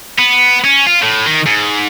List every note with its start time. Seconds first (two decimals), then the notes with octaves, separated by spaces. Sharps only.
0.18 B3
0.64 C#4
0.86 F4
1.02 A2
1.26 D#3
1.46 G#2